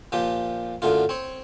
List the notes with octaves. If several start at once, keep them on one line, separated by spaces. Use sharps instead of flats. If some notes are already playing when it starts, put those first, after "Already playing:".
A#2 F3 G4
F#2 A2 D3 F4
C4 C#5